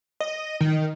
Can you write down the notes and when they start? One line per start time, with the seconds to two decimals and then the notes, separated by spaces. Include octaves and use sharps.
0.20 D#5
0.61 D#3